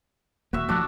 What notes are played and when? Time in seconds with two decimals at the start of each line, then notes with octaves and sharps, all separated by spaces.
0.53 D#1 A#3 F#4 E5
0.69 G2 F3 A3 D4 F#4